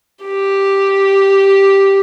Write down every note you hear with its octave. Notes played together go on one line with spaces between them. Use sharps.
G4